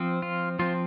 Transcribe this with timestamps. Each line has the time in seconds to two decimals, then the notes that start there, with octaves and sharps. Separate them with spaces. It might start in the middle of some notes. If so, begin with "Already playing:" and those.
Already playing: F3 C4
0.22 F4
0.59 F3 C4 F4